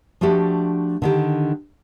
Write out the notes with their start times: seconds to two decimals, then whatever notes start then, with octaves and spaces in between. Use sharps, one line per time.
0.21 F3 A3 D4 F#4 G4
1.02 D3 D#3 G4